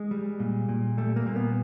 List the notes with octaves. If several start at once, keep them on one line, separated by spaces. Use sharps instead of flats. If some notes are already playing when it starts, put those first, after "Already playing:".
Already playing: G#3
G3
A#2
A#2
G3 A3
A#3
A#2
B3